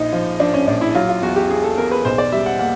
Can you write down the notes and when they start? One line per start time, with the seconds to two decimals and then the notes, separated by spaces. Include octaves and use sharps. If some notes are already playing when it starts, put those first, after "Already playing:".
Already playing: A#1 D#4
0.13 F3
0.40 F3 D4
0.54 C#4
0.67 A#1 D4
0.81 E4
0.95 F#3 F4
1.09 F4
1.22 E2 F#4
1.36 G4
1.50 E2 G#4
1.64 A4
1.77 E2 A#4
1.91 B4
2.05 B1 C5
2.18 D5
2.32 G3 E5
2.46 F#5
2.59 A#3 F#5